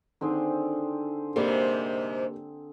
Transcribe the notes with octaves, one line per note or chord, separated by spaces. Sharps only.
D3 D#3 C4 G#4
G#2 C3 G3 A#3 G4